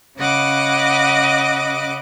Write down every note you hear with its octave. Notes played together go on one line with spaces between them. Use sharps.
C#3 D#5 F#5 B5 D6